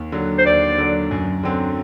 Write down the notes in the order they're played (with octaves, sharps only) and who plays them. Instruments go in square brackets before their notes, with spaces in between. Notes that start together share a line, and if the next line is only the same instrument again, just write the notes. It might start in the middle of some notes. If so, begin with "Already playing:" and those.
Already playing: [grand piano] D#2
D3 F#3
[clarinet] C5
[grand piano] D#2 [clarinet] D5
[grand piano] D3 F#3
F#2
D3 F#3 C4